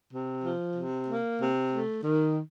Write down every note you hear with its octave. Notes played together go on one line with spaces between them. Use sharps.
C3
F3
C3
A#3
C3
A3
D#3